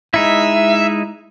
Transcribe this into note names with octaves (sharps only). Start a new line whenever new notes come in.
G#3 D#4 E4 E5